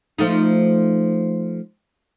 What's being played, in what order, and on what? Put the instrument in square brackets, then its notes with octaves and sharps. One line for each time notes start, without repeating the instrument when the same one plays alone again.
[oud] F3 A3 D#4